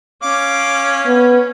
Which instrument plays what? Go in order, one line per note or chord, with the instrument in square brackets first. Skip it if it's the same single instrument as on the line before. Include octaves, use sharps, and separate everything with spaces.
[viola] C#4 [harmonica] F5 D6
[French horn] B3